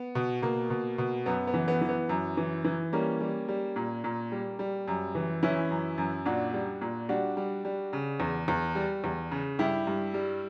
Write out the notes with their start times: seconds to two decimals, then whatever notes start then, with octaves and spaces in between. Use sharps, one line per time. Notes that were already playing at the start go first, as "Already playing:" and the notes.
Already playing: B3
0.15 B2
0.42 B2 A#3
0.70 B2
0.98 B2
1.26 F#2 B3
1.47 B3
1.54 E3
1.68 B3
1.81 E3
1.89 B3
2.09 F#2
2.37 E3
2.64 E3
2.93 G3 A#3 C#4
3.21 G3
3.48 G3
3.76 A#2
4.04 A#2
4.32 G3
4.59 G3
4.88 F#2
5.15 E3
5.43 E3 C#4 E4
5.70 F#2
5.98 F#2
6.26 A#2 D4 F#4
6.53 G3
6.81 A#2
7.09 G3 D4 F#4
7.37 G3
7.65 G3
7.93 C#3
8.20 E2
8.48 E2
8.75 G3
9.04 E2
9.31 C#3
9.59 G2 E4 G4
9.87 G2
10.14 G3